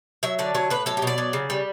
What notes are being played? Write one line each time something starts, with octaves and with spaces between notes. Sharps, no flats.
F#3 E5
D3 D5
F#3 C#5
A2 B4
F#3 A4
G4
B2 D5
F#3
C#3
G3